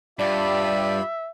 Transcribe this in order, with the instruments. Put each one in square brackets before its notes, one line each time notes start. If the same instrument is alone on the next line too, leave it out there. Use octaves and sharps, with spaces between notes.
[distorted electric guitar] G2 [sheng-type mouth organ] F4 G4 B5 [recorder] D5 [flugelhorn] E5